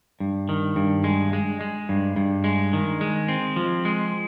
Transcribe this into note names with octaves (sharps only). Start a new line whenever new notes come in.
G2
D#3
G2
G#3
G#3
G#3
G2
G2
G#3
D#3
G#3
C4
F3
G#3